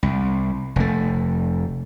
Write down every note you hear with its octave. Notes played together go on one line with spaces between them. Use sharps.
C2
F1 A3